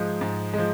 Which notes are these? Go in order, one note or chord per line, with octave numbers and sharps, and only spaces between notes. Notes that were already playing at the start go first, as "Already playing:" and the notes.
Already playing: G#2 F3 G#3 G#4
G#2
F3 G#3